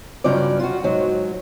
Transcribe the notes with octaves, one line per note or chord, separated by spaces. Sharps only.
G2 C#3 F#3 F4 D5
F4 F#4
G#2 F#3